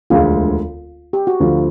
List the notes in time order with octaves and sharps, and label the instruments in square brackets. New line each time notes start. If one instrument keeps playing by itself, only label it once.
[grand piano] E1 D2 D3 F3 G#3 [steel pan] F4
[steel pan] G4
F#4
[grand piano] D2 D3 F3 [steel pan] F4